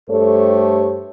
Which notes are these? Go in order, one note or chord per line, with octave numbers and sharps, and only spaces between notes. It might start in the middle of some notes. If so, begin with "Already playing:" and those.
G2 A3 G4 A4 C5 C#5